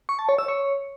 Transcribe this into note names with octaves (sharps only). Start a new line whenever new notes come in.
C#6
A5
C#5
E6
C#5